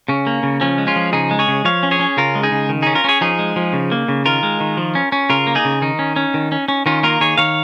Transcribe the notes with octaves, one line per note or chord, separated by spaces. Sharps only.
C#3 C#4
A#3
C#3
F3 C#4
G#3
C#4 F4
F3
C#3 D#4 G#4
G#3
G#4 C#5
C#3
F3 C#5 F5
C#4
G#4 C#5
C#4
C#3 F4 A#4
G#3
D#4 G#4
C#3
D#3
C#4 D#4 G#4
F4 A#4
C#4 G#4 C#5
F3 D#4 G#4
G#3
F3
C#3
A#3
C#3
D#3 F4 A#4
G#3
D#3
F3
C#4
C#4
C#3 F4 A#4
A#3
D#4 G#4
C#3
D#3 D#4
C#4
C#4
D#3
C#4
C#4
D#3 C#4 F4
A#3 F4 A#4
D#3 G#4 C#5
D#3 C#5 F5